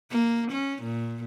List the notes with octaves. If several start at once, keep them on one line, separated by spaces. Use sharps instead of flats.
A#3
C#4
A#2